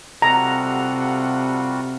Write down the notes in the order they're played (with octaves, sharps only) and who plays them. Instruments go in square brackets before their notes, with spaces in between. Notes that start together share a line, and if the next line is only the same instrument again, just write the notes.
[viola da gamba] C3 [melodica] G3 F4 F#4 [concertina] A4 F#5 [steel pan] A#5